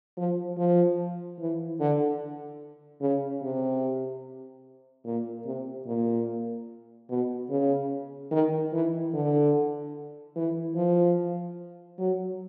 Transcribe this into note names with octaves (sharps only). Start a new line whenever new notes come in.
F3
F3
E3
D3
C#3
C3
A#2
C3
A#2
B2
C#3
D#3
E3
D3
E3
F3
F#3